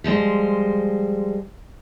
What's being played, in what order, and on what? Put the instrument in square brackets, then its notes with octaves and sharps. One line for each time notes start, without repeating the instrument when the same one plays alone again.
[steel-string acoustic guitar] F3 G3 G#3 C5